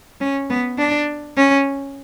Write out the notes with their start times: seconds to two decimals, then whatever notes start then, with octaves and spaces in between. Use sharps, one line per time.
0.21 C#4
0.50 B3
0.79 D4
1.37 C#4